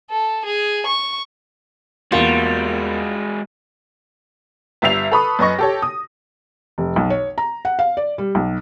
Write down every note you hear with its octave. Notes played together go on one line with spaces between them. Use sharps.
A4
G#4
C#6
E2 G3 G#3 A#3 F4 F#4 C7
G1 G3 E5 C7 F7
A4 B4 B5 C#6 D#6
F#2 B4 D#5 C#6 A#6
G4 A4 C#5
D#6
F1
B1
C#5
A#5
F#5
F5
D5
G3
B1